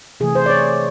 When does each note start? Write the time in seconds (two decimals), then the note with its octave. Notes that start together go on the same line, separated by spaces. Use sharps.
0.20 C3 E3 A3 G#4
0.35 C5
0.46 D5
0.50 C#5